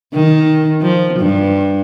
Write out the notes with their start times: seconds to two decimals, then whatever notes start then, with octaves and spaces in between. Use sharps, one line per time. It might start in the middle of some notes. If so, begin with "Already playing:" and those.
0.14 D#3
0.82 F3
1.20 G2